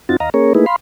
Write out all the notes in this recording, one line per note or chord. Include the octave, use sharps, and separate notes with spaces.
F#2 C4 D#4 F4 F#4 A6
D#2 D#5 F5 A#5
A#3 C#4 G#4 A#4 C#5
A3 A#3 D#4 E4 G#4 B4
F5 B5 C6